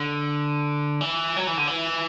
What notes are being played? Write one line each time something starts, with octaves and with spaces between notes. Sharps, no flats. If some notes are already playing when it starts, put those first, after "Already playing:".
Already playing: D3
E3
F#3
E3
D3
E3